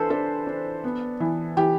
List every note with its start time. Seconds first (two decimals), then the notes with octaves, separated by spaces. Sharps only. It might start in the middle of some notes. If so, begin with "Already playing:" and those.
Already playing: E3 D4 A4 B4 C5
0.10 D4 A4
0.47 D4
0.84 B3
1.20 E3
1.57 E3 G4